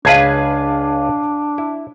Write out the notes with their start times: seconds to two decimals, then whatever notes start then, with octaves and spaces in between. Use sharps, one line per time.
0.05 C#2 D4 G#4 B4 F5 A5 G#6
1.58 E4